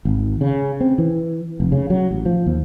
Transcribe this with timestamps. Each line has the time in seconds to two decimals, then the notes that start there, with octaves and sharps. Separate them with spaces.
0.05 G#1
0.41 C#3
0.80 C4
0.98 E3
1.60 F1
1.72 C#3
1.90 F#3
2.11 A1
2.26 F3
2.46 D#2